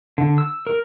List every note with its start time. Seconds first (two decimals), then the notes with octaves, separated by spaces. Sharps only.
0.18 D3
0.38 E6
0.67 A#4